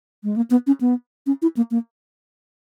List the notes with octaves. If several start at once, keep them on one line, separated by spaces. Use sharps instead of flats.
G#3
A#3
B3
C#4
B3
C#4
E4
A#3
A#3